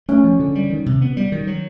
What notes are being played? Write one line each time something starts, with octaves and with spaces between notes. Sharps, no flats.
A3 C#4
F3
D3
G3
D#3
C3
B3
G3
D#3
F#3